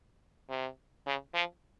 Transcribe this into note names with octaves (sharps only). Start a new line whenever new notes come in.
C3
C#3
F3